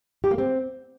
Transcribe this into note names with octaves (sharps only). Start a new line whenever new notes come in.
G4
A#3
C4